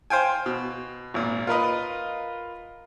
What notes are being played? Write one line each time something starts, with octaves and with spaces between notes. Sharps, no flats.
C5 F5 G5 G#5
B2
G#1 A#2
F4 A#4 B4 D#5